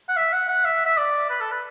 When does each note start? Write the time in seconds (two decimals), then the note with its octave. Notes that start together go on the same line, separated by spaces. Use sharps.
0.08 F#5
0.17 E5
0.33 F#5
0.48 F#5
0.65 E5
0.86 E5
0.97 D5
1.30 B4
1.40 A4
1.51 B4